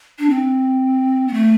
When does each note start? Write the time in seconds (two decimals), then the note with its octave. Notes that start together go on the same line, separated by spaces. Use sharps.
0.19 D4
0.30 C4
1.28 B3
1.33 A3